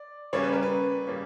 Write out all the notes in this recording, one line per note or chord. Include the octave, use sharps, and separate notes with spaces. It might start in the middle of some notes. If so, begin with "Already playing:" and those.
Already playing: D5
C#3 G3 A#3 C#4 C#5
B4
A#4
B4
C#3 G3 A#3 C#4